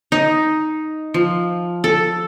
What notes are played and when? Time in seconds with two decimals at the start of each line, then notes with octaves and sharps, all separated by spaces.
0.12 D#4
1.14 F3
1.84 A4